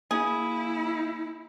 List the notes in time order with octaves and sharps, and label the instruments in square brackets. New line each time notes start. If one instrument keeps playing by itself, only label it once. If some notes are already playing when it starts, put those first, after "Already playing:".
[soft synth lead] A#3 [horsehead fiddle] E4 [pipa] G#4